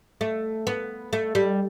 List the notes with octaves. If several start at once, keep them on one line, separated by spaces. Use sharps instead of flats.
A3
B3
A3
G3